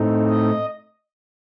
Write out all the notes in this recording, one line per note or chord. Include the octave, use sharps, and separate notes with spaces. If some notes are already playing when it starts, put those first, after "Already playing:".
Already playing: A2 A3 C4 D#4
D#5